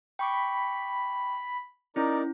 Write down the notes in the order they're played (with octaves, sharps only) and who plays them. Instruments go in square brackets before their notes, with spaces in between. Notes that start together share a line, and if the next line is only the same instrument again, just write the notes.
[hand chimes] G5 C#6 D6 [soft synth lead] B5
[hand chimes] C#4 E4 [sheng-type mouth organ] D#4 A#4 D5